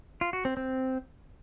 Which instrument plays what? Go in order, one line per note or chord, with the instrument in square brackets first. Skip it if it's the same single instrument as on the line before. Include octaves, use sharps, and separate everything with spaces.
[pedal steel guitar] F4
F#4
C4
C4